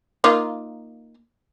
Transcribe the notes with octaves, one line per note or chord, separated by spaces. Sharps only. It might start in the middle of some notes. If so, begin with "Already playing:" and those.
A#3 D#4 F4